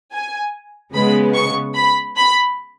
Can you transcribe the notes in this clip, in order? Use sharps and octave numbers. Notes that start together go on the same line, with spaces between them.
G#5
C#3 G#3 B3 B5
C#6
B5
B5